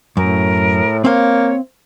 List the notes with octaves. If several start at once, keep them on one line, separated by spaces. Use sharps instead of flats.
F#2 A2 A#4
A#3 C4 C#5 F5